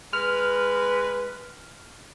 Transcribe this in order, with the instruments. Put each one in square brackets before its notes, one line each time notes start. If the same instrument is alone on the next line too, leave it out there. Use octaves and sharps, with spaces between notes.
[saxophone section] G#3 B4 [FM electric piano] F6